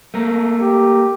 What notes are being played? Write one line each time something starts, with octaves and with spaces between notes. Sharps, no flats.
A3 A#3
G4